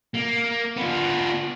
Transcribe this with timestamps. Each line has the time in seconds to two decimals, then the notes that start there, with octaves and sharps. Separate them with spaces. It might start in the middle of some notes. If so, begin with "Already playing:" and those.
0.14 A#3
0.77 B3 F4